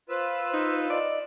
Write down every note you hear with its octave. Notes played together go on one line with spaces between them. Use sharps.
F4 B4 C5 E6
D#4
D5 D#5